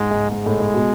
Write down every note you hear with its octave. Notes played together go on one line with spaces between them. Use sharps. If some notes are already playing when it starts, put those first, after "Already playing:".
Already playing: G#2 G#3
G#2
G#2 G#3
A2
A2
B2